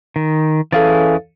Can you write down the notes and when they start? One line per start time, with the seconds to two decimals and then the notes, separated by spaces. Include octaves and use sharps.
0.16 D#3
0.72 E3 C#4 G#4 A4 F5 A6